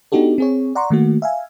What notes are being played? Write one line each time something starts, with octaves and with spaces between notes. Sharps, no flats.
B3 D4 D#4 F#4 G4 A4
C4 G#4 C#5
D5 F#5 A#5 C6 C#6
D#3 A3 A#3 F#4
E5 F5 G#5